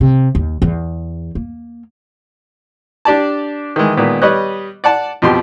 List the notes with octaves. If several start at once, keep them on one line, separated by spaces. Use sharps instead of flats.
C3
D#2
E2
A#3
D4 G4 D5 A5
D#3 E3 G#3
A#2 D#3 G#3 B3
G3 B4 C#5 D#5 F#6
D5 F#5 A5
F2 B2 F4 G4 C6